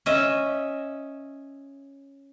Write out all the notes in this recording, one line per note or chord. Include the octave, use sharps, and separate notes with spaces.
C#4 D#5 E5